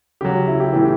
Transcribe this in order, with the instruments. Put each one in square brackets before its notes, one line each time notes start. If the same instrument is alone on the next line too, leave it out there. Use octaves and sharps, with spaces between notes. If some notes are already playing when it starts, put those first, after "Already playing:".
[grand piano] C#3 F#3 G4
E4
G4
A2 E3